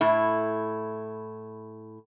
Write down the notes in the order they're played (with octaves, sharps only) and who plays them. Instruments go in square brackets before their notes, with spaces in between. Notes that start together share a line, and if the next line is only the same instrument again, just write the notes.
[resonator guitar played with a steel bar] A2 E4